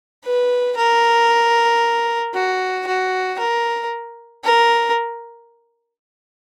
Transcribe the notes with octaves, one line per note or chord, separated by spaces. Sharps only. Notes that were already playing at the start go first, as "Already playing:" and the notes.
B4
A#4
F#4
F#4
A#4
A#4